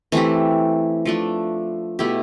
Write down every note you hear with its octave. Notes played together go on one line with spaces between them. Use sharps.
E3 A3 C4 G4
F3 A3 D4
B2 A3 E4 G4